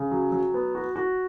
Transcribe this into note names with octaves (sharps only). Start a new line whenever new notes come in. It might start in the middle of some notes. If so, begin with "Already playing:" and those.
Already playing: C#3
F#3
F#3
B3
F#4
F#4